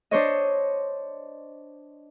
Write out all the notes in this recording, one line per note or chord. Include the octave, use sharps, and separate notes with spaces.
D4 C5 C#5 D#5